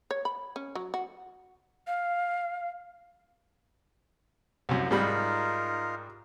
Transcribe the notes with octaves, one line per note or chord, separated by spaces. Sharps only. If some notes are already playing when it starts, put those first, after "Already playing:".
C#5
B5
C#4
F#3
F#4
F5
C2 F#2
G#2 G3 D#4 F4 A#4 B5